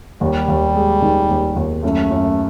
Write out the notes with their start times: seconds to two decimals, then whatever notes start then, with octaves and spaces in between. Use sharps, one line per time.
0.21 D#2 G3
0.48 D#2
0.75 G#3
1.02 D#3
1.29 D#2
1.56 D#2
1.84 F#2 A3
2.11 F#2